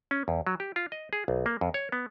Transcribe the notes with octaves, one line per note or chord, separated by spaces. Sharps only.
C#4
E2
F#3
G4
F4
D#5
G#4
B1
A#3
F2
C#5
B3